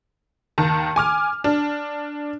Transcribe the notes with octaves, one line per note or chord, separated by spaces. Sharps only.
D#2 D#3 A5
G#5 D6 F6
D4